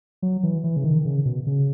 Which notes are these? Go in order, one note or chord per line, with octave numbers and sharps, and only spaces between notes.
F#3
E3
E3
C#3
D#3
C#3
B2
C#3